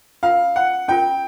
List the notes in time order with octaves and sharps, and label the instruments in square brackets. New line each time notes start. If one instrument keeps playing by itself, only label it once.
[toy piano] C#4 F4 A#4 [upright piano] F5
[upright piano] F#5
[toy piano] C#4 F4 A#4 [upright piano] G5